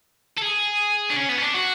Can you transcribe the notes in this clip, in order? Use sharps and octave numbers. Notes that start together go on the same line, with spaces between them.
A4
G#4
D4
C#4
B3
C#4
D4
F#4